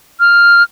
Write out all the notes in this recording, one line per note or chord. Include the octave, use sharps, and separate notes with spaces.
F6